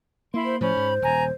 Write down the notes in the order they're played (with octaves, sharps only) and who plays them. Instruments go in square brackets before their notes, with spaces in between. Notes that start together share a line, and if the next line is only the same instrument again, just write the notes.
[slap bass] A#3 [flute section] E4 B5 C6
[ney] C5
[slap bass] A2 F3 [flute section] C#4 B5 [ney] C5
[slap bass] G#2
[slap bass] D#1 [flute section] G#5 A#5